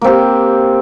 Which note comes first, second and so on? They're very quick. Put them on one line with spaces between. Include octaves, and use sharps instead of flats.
A#3 C4 G4